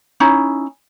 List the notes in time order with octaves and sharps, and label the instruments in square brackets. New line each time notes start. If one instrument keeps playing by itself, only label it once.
[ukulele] C#4 D#4 E4